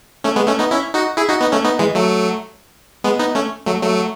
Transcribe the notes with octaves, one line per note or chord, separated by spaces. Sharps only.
A3 C#4
G#3 B3
A3 C#4
B3 D#4
C#4 E4
D#4 F#4
E4 G#4
D#4 F#4
B3 D#4
A3 C#4
B3 D#4
E3 G#3
F#3 A3
G#3 B3
B3 D#4
A3 C#4
F#3 A3
F#3 A3